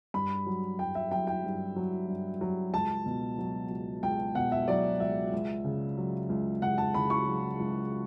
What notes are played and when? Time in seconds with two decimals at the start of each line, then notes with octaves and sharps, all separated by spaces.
0.14 G2 B5
0.46 F#3
0.79 G2 G5
0.95 E5
1.11 F#3 G5
1.27 G5
1.44 G2
1.76 F#3
2.08 G2
2.41 F#3
2.73 C#2 A5
3.06 B2
3.38 F#3
3.70 C#2
4.03 C#2 G5
4.35 B2 F#5
4.52 E5
4.68 F#3 D5
5.00 C#2 E5
5.33 C#2
5.65 C#3
5.97 F#3
6.30 C#2
6.62 C#2 F#5
6.78 A5
6.94 C#3 B5
7.10 C#6
7.27 F#3
7.60 C#2